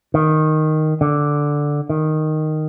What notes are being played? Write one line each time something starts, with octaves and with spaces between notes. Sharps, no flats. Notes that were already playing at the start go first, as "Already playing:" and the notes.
D#3
D3
D#3